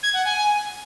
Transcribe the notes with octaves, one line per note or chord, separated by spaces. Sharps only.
G#6
F#5
G#5